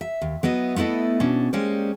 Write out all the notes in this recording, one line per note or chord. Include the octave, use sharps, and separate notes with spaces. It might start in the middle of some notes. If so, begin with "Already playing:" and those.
E5
D#2
F#3 B3 E4 D#5
A3 B3 E4 A4 D#5
B2 C#4 D4
G#3 A#3 C#4 G4 C5 D5